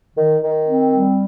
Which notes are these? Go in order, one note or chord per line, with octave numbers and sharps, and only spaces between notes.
D#3
D#3
C4
G3